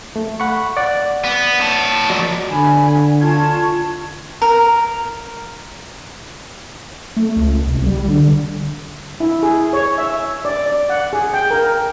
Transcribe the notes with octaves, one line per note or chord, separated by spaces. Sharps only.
A3
F#5 B5 C#6
D5 F#5
B3
C#5 A5
F3 G#3 A#3 F#4 D5
D3 G#5 B5
F4 A5 C#6 G#6
A#4
A3
C#2
C2
G3
D3
E4
G#4
C#5
E5
D5
D5
F#5
G#4
G5
A#4